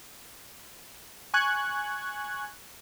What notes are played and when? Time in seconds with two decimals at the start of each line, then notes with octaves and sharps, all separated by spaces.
1.34 G#5 C#6 F#6 G#6